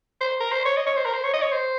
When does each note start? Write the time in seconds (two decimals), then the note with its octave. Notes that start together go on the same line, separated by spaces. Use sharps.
0.21 C5
0.40 A#4
0.52 C5
0.65 C#5
0.77 D#5
0.86 C#5
0.96 C5
1.06 A#4
1.14 C5
1.24 C#5
1.34 D#5
1.42 C#5
1.52 C5